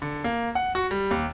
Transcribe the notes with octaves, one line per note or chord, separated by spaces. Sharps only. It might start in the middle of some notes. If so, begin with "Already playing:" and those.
D3
A#3
F#5
F#4
G3
D#2